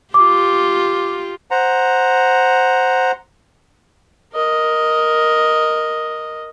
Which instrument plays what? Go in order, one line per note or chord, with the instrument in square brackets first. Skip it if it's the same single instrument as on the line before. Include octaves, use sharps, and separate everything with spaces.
[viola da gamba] F4 G4 [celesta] D6
[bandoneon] C5 F#5 A#5
[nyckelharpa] A#4 D#5